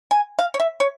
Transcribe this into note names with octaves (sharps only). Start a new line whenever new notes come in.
G#5
F5
C#5
E5
C#5